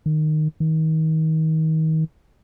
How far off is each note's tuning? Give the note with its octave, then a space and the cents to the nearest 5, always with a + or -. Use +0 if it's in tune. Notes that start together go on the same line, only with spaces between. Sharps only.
D#3 -15
D#3 +30